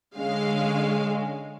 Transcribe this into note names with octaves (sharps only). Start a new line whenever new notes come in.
D3 G#3 C#4 F5